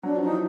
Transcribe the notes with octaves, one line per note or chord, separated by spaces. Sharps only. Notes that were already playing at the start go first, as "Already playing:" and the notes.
F#3 D4
F3
D#4
E3